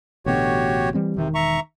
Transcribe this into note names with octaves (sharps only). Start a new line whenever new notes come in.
A1 B2 D3 F#4 G4 C#5
E3 G3 C4
E1 C3 D#3
E5 A#5 C#6